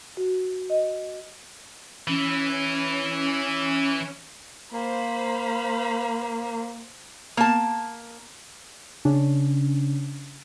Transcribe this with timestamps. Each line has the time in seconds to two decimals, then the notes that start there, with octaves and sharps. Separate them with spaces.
0.17 F#4
0.70 D#5
2.08 E3 C#4
4.74 A#3 C5 F5 B5
7.37 A#3 A5
9.05 C#3 C#4 D4